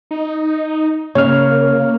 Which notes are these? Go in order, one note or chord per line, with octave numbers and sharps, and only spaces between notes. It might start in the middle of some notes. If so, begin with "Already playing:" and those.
D#4
C#3 A#3 C#5 F6